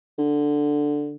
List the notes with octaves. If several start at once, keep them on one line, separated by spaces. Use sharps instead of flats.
D3